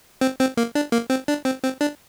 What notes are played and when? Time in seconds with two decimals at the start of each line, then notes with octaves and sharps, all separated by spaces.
0.21 C4
0.40 C4
0.57 A#3
0.75 D4
0.92 A#3
1.10 C4
1.28 D4
1.45 C4
1.63 C4
1.81 D4